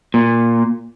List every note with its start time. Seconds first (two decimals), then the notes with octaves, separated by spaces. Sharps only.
0.14 A#2